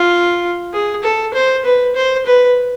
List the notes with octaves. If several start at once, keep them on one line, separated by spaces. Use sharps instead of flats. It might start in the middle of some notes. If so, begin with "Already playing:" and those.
Already playing: F4
G#4
A4
C5
B4
C5
B4